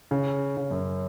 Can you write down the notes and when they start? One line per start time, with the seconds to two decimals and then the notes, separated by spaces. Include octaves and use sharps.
0.11 C#3
0.57 C#3
0.71 F#2